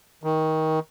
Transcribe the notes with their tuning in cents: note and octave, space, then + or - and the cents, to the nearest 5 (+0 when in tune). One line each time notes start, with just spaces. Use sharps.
D#3 +20